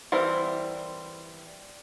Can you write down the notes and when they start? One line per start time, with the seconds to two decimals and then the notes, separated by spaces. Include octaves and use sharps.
0.12 E3 G3 C4 A#4